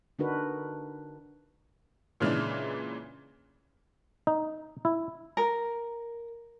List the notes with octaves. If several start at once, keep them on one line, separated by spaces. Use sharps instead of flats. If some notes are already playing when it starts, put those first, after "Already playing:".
D3 D4 D#4 F#4 A#4 B4
A#2 C#3 E3 G#3 D4
D#4
E4
A#4